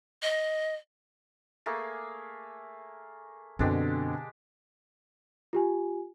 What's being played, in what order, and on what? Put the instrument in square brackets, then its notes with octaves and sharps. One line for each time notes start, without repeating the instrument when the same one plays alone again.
[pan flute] D#5
[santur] A3 A#3 G#4
[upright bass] F#2 [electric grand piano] B2 D3 C4 [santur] G#3 D4 G4
[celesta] F4 G4 G#5